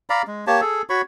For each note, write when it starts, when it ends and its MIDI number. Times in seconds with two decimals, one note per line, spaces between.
0.10 0.22 74
0.10 0.22 77
0.10 0.22 82
0.10 0.22 83
0.27 0.45 56
0.47 0.61 58
0.47 0.61 67
0.47 0.61 73
0.47 0.61 81
0.61 0.82 68
0.61 0.82 69
0.90 1.01 66
0.90 1.01 73
0.90 1.01 83
0.90 1.01 85